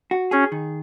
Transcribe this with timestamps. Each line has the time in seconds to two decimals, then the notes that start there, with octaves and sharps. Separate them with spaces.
0.11 F#4
0.31 C#4 G#4
0.52 D#3